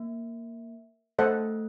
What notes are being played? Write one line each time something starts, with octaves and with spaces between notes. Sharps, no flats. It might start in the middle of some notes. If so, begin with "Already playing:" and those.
Already playing: A#3
A3 A4 C5 D#5 F#5